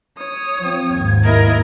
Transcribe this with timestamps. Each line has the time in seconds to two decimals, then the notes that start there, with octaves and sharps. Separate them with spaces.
0.18 C#5 D#6
0.59 F3 C4
0.93 D#2 G#2 G#6
1.26 A#3 E4 A#4 D#5 G#6